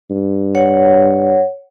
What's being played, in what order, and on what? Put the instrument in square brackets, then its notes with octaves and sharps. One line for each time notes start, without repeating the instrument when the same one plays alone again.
[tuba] G2
[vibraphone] C#5 F#5